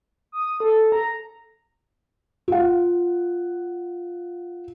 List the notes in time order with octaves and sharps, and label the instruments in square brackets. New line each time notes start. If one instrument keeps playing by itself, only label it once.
[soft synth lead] D#6
A4
A#5
[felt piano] F4 F#5